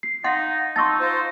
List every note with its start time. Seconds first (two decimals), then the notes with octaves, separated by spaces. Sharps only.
0.03 C7
0.24 D#4 F5 F#5 C6 A6
0.76 D#4 A5 C6 C#6 E6 A6
1.00 F4 C5